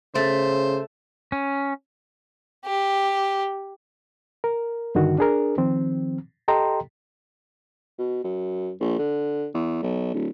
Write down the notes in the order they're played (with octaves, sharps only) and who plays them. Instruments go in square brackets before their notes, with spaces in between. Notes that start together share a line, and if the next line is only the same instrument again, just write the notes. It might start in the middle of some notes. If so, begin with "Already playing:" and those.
[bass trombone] C#3 [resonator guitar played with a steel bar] A3 [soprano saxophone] C5
[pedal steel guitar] C#4
[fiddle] G4
[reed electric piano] A#4
G2 D3 D#3 F#4
D4 G#4 A#4
D#3 F3 C4
G4 A4 D#5 G5 A#5 C6
[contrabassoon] B2
F#2
A#1
D3
E2
B1
D1